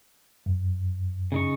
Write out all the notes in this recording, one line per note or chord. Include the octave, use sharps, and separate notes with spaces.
F#2
C#3 D#4 C#6